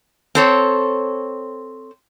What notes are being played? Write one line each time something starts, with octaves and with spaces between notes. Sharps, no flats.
C4 A4 C#5